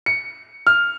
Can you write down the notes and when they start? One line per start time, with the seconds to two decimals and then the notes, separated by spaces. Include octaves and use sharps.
0.06 C#7
0.67 F6